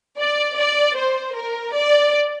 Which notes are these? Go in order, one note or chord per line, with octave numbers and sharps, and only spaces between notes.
D5
D5
C5
A#4
D5